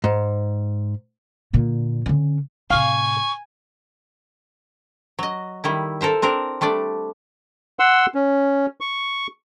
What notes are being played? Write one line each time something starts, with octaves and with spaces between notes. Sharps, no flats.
G#2
A#2 D3
D3 C#4
A2 C3 F5 G#5 C#6
F#3 D#5
D#3 G3 E4
A4 A#4 C5 E5
C4 D4 A#4
G3 A3 D4 D5
F#5 C6 E6
C#4
C#6